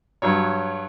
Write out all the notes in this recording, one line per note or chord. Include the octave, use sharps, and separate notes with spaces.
G2 F#3 C#5